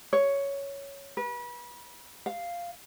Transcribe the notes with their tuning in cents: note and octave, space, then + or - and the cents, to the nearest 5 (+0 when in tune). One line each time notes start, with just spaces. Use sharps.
C#5 +5
B4 -35
F5 -5